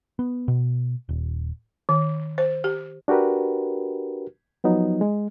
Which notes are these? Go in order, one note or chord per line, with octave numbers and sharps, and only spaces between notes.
B3
B2
D#1
D#3
C5
G4
D4 F#4 G4 A#4 B4
F3 F#3 B3 D#4
G#3